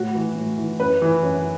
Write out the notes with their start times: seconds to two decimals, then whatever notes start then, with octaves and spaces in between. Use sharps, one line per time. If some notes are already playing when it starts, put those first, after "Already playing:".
Already playing: A2 F#4
0.15 E3
0.35 A2
0.58 E3
0.79 F#2 B4
1.02 E3
1.23 F#2